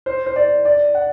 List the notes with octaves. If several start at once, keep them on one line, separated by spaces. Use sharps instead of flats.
C5
C5
D5
D5
F#5